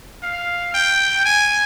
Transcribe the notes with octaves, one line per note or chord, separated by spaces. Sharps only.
F5
G5
G#5